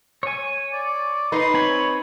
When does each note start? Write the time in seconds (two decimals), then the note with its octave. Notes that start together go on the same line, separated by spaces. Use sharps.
0.23 C#5 G#5
0.73 D5
1.32 D#4 B4 C6
1.54 C4 C#5 G#5 B5